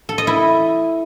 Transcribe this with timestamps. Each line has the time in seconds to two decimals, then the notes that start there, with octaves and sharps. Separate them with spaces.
0.09 A4
0.18 D#5
0.27 E4